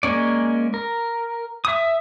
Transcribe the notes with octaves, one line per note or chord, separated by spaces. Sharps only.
G#3 A#3 C#4 D5
A#4
E5 D#6